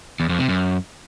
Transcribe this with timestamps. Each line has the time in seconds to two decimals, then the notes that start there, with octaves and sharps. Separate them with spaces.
0.20 E2
0.29 F2
0.39 C3
0.49 F#2